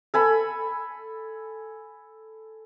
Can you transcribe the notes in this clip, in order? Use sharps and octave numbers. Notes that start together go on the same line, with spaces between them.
A4 G#5 B5